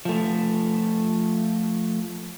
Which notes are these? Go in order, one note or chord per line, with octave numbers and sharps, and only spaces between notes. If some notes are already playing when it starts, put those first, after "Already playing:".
F3 A3